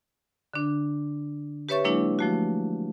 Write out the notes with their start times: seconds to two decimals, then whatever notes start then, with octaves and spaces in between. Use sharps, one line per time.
0.54 D3 D4
1.69 G4 B4 C#5 E5 C#6 A6
1.84 F#3 G#3 A#3 D4 E4
2.19 F3 A3 F#4